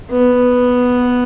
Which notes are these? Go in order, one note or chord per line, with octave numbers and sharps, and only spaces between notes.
B3